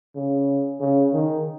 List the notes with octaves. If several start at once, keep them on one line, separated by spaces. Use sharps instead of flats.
C#3
C#3
D#3